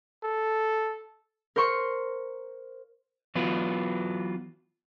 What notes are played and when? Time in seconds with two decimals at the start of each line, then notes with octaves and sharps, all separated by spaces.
0.23 A4
1.56 A#4 C5 C6 C#6
3.35 E3 F#3 B3 F4 B4